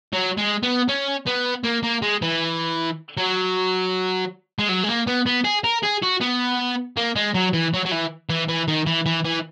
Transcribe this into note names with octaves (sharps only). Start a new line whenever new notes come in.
F#3
G#3
B3
C#4
B3
A#3
A#3
G#3
E3
F#3
G#3
F#3
G#3
A#3
B3
B3
G#4
A#4
G#4
F#4
B3
A#3
G#3
F#3
E3
F#3
F#3
E3
E3
E3
D#3
E3
E3
E3